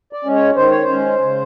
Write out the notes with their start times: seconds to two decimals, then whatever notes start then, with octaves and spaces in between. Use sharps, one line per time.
0.13 D5
0.25 G#3 C#4
0.35 C#5
0.56 D#3 C5
0.70 C#5
0.84 C5
0.89 G#3 C#4
1.21 C#3